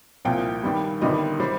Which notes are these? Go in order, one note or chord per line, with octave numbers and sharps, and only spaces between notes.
C2 A#2 F3 G5
G2 D#3 G3
G1 G2 D#3 G3 D#5
G3 C5